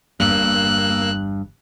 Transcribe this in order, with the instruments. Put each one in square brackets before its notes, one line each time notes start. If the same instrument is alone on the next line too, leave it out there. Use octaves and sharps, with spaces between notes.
[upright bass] G1 E2 [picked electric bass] G2 [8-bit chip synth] A#3 E6 [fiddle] F#6